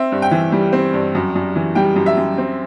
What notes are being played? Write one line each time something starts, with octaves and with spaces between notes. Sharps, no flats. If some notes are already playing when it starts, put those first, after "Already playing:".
Already playing: C4 E5
G2
G5
E3
G3
C4
G2
F#2
F#2
E3
G3 G5
F#2
E5
F#2
C4